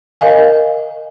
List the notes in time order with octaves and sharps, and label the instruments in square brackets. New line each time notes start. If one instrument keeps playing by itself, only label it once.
[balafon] A#4 D#5 F5 G#5